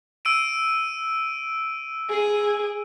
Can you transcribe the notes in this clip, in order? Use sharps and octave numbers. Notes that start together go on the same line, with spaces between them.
E6 D7 D#7
G#4